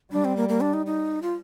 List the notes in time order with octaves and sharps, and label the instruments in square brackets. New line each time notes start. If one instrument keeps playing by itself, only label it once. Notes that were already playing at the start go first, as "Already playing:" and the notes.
[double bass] G3 [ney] D4
[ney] C4
A#3
A#3
D4
D#4
D#4
F4